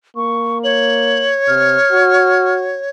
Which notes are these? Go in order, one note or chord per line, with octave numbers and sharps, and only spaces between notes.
A#3 C#6
C#5 F#7
C3 F6
F#4